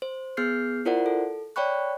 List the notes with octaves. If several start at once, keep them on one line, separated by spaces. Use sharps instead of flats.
C5
B3 G#4 F6 G6 C7
E4 F4 A#4 C5 D5 F#5
A4
C#5 D5 G5 B5 C#6 F#6